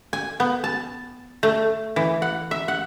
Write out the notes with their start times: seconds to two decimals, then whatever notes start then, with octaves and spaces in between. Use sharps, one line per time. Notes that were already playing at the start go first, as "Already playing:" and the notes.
0.13 G#5
0.40 B3
0.64 A5
1.43 A3
1.96 E3
2.22 F#5
2.51 E5
2.68 F#5